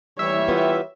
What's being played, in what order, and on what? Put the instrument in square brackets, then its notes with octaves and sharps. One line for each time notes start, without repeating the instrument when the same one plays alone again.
[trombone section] E3 G3 [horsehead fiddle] C#5 [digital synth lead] E5
[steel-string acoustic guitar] B3 F4 G4